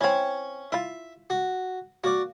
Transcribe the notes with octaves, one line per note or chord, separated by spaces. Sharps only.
C4 C#4 E4 C#5
E4 F4 E5
F#4
A#3 F#4 D5